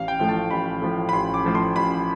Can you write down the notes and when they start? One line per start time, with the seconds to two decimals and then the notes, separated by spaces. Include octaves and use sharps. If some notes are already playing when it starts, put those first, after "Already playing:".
Already playing: A1 F5
0.08 G5
0.19 A2 F3 A3
0.29 A5
0.50 A1 B5
0.81 A2 F3 A3
1.09 B5
1.13 A1 C6
1.34 D6
1.44 A2 F3 A3
1.55 C6
1.75 A1 B5